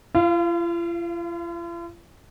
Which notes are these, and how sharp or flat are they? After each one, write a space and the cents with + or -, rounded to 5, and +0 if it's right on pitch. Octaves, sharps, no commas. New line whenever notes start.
F4 -45 F5 -15